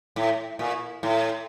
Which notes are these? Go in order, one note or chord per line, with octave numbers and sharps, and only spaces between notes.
A2
A#2
A2